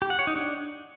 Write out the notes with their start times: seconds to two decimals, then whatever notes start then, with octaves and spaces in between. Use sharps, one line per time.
0.02 G4
0.10 F#5
0.19 C#5
0.27 D#4
0.36 D4